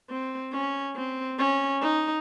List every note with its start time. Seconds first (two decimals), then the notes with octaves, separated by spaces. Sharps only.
0.10 C4
0.53 C#4
0.96 C4
1.39 C#4
1.81 D#4